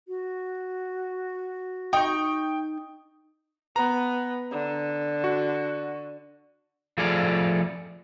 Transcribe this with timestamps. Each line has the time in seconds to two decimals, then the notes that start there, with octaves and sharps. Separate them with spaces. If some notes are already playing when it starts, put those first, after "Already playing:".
0.08 F#4
1.93 D#4 G5 C#6
3.76 B3 A#5
4.51 D3
5.24 F#4
6.98 F3 A3 G#4 A4 D5 F5